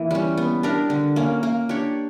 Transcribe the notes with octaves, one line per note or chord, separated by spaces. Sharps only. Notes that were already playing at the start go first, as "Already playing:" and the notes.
Already playing: E3 A#3
G3 C#4
B3
D4 G4 A#4
D3
A#3 C#4
A#3
D4 G4 C#5